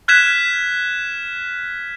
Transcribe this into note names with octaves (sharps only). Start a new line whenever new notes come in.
F6 F#6 G#6 B6 E7